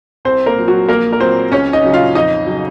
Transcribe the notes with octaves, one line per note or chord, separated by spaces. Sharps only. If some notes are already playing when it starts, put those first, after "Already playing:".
C2 C4 C5
A#3 A#4
A#2 F#3
F#3 F#4
A#1 A#3 A#4
A#4
A#2 F#3 C4 C5
C#2 C#4 C#5
D#4 D#5
C#3 F#3
F4 F5
F2 D#4 D#5
C#3 F#3